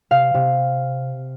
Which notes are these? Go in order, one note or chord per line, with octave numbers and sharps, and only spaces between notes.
C3 F5
C3